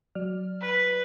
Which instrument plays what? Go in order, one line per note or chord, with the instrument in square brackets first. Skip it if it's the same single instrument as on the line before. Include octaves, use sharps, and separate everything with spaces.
[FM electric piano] F#3 D5 F6
[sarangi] B4